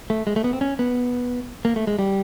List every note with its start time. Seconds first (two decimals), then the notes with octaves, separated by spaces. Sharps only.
0.10 A3
0.27 G#3
0.36 A3
0.44 B3
0.53 C4
0.61 C#4
0.79 B3
1.65 A#3
1.76 A3
1.87 G#3
1.99 G3